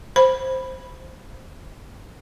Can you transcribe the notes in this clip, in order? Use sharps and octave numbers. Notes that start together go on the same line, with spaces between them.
C5 B5